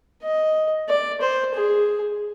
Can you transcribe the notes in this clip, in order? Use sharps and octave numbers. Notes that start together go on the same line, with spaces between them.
D#5
D5
C5
G#4